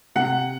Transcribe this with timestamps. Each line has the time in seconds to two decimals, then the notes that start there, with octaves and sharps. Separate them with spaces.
0.15 C3 F#5